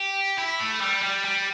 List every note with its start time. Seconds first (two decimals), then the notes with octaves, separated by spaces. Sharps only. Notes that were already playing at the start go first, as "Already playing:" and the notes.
Already playing: G4
0.38 E4
0.59 A3
0.81 G3
1.03 G3
1.25 G3